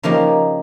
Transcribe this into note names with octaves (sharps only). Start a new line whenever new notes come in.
C#3 F3 A#3 D#4 G4